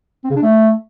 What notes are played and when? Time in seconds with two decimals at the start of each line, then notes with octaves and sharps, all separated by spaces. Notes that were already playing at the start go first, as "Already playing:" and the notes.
0.24 C4
0.30 C#3
0.36 D4
0.42 A3